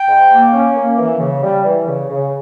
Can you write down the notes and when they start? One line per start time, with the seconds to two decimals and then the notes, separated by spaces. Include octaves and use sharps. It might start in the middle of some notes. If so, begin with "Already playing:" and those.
Already playing: G5
0.08 G#2
0.31 A#3
0.53 C#4
0.75 A#3
0.98 E3
1.20 C#3
1.43 G3
1.64 E3
1.87 C#3
2.10 C#3